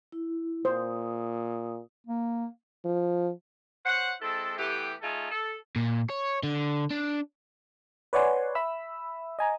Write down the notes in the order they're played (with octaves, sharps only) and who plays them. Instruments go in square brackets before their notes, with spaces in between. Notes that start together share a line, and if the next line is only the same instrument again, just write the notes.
[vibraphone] E4
[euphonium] A#2 [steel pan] C5 [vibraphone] D#6
[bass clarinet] A#3
[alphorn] F3
[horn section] C5 C#5 F#5
G#3 C4 E4 A4
E3 A3 B3 G4
A3 D#4 F4 G#4 A4
A4
[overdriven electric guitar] A#2
C#5
D3
D4
[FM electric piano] B4 C#5 D5 F#5 G#5 C6
E5 B5 E6
D#5 G#5 A#5